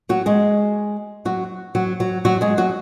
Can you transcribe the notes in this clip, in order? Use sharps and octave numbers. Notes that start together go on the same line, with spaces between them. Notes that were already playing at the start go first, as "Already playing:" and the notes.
F#3 F#4
G#3 G#4
F#3 F#4
F#3 F#4
F#3 F#4
F#3 F#4
G#3 G#4
F#3 F#4